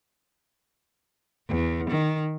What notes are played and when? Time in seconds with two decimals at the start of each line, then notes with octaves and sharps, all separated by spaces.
1.49 E2
1.90 D#3